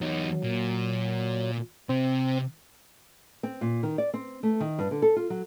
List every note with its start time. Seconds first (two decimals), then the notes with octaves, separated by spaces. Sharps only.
0.01 E2 F#3 D#4
0.43 A#2
1.89 C3 C4
3.43 C4
3.61 A#2
3.83 D#3
3.98 D5
4.14 C4
4.43 A3
4.60 D#3
4.79 G2
4.91 D3
5.02 A4
5.16 F4
5.30 F#3